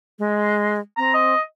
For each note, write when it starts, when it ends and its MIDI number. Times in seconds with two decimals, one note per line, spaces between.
0.19 0.79 56
0.98 1.34 60
0.98 1.14 82
1.14 1.40 75